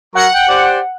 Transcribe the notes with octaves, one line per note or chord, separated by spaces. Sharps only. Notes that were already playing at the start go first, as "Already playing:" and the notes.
F#3 A#4 F#5 C#6
G5
G4 C5 D5